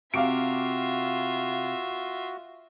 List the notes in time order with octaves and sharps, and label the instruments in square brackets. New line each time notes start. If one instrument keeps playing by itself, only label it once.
[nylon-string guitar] C3 [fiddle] F4 E5 [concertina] F#4 [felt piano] F5 D6 D7